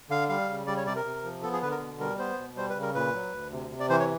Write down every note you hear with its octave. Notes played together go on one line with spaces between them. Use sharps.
D3 F5
G3 F5
C#3
G3 D5
C#5
C3 D5
A#4
C3
F3
B3 A4
G#4
D3 B4
A#4
B2
G3 A#4
B3 C5
B2
G3 C5
B4
C#3
A#4
A#2 B4
F#3
D2
C3
C3
D5
E3 C5
C#5